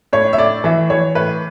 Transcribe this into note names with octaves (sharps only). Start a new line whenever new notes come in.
A2 C#5
E5
A2 D5
E3 E5
E3 C#5
A2 B4